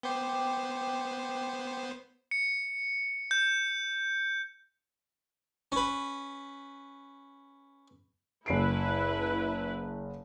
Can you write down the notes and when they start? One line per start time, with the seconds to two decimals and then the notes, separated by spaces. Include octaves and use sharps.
0.03 B3 C5 G5 D6
2.31 C#7
3.31 G6
5.72 C#4 B4
8.46 F#1 E4 B4 C7 D7